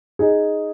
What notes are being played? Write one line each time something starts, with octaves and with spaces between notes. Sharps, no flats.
D#4 G#4